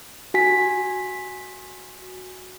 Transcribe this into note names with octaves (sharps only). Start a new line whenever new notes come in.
F#4 G#5 B6